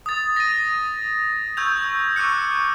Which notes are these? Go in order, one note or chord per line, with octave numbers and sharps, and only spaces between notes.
D#6 A6
A#6 D#7
C#6 E6 G6 G#6 F7
C#6 D6 E6 F#6 C#7